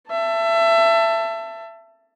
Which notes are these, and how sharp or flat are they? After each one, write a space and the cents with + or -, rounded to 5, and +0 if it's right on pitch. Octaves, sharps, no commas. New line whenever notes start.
E5 +25 A5 +15